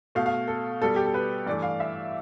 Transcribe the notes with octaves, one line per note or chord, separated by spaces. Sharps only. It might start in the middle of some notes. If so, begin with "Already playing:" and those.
B2 A3 F5
F5
A4
B2 G3 A4
G4
A4
B4
G2 E3 A3 D5
F5
E5